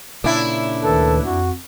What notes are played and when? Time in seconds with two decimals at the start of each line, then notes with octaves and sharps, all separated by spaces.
0.24 A#2 C#3 D4 E4
0.83 D2 D#3 A4 B4
1.25 F2 F#4